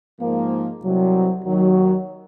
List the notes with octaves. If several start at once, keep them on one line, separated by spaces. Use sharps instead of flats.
G#2 F3 A#3
C2 C3 F#3
D#2 D#3 F#3